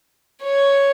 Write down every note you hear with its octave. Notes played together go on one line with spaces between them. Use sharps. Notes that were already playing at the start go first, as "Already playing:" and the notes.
C#5